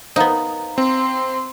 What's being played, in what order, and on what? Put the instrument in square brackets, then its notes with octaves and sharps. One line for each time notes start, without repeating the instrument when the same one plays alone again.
[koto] B3 D#4 [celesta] C5 F5 A#5
[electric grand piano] C4 [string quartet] C6